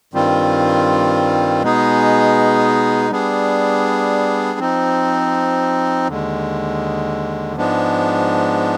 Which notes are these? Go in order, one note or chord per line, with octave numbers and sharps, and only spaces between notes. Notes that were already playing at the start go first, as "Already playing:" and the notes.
G2 D#3 G3 C4 F4
B2 G#3 B3 D#4 G#4
G3 B3 D4 G#4
F3 C4 D#4
D#2 D3 G#3
G#2 F3 G#3 B3 D4